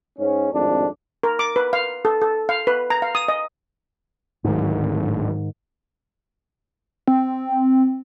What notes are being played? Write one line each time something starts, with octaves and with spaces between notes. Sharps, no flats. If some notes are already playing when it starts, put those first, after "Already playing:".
G#2 C#4
G#1 F2 A2 D4
A#4
D6
B4
F5
A4
A4
F5
B4
A#5
F5
D#6
D#5
D1 G#2 D#3
C4